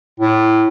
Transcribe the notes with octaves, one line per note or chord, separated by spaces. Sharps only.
A2